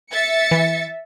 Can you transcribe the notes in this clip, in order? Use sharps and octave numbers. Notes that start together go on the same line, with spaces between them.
E5 A6 C#7
E3